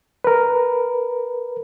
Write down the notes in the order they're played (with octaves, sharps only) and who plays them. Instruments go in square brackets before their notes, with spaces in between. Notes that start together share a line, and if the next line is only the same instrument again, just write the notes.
[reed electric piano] A#4 B4